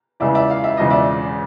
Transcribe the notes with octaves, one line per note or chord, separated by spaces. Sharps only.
E2 C#3 E3 G#3 D5 E5
D5 E5
F5
E5
E1 E2 C#3 F3 G#3 D#5
D5 E5